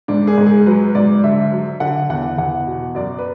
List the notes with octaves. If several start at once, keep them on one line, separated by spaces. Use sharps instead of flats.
G#2 D4
G#4
G#2
G#4
F#3 B4
G#2 D5
D3 E5
F#3
D3 F#5
E2 F#5
E2 F#5
B2
F#2 D5
B4